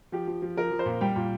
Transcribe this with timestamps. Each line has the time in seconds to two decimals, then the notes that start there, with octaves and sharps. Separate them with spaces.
0.12 F3 G4
0.27 F3
0.42 F3
0.57 F3 A#4
0.71 F3
0.79 C5
0.86 A#2
1.01 G3 G5
1.16 A#2